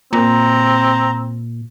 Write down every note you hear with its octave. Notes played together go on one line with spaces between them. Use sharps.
A#2 C4 A#5